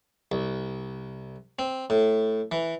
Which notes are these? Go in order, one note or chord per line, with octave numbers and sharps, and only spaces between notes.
C2
C4
A2
E3